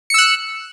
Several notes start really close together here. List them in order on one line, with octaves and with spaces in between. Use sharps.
C#7 E6 F#6